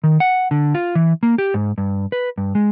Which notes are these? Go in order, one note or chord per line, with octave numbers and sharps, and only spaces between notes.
D#3
F#5
D3
F4
E3
A#3
G4
G#2
G2
B4
G2
G#3